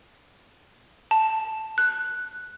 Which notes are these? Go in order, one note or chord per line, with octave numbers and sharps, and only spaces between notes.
A5
F#6